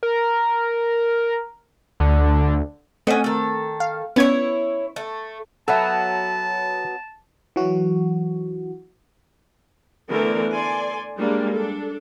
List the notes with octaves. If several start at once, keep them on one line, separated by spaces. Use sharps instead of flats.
A#4
D2 D3
A3 C4 C#4 D#5 F#5
D#3 A4
F5
B3 C#4 E4 C#5 G#6
A3
F#3 B3 A4 E5 A5
E3 F#3 F#4
D3 E3 A3 B3 A#4
A4 D5 G#5 C6
G3 G#3 A#3 D4
D4 A4